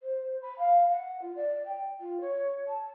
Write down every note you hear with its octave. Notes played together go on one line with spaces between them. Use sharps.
C5
B5
F5
F#5
F4
D5
G5
F4
C#5
A5